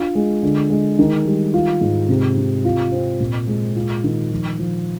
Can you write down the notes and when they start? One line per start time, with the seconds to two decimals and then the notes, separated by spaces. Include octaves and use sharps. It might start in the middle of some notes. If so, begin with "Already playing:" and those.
Already playing: D4 F4
0.15 G#3
0.43 D3
0.70 G#3
0.99 D#3
1.25 G3
1.54 F4
1.81 G#2
2.09 C3
2.37 C3
2.65 F4
2.92 C4
3.20 A#2
3.48 G#3
3.76 F4
4.04 D#3
4.31 F3
4.59 F3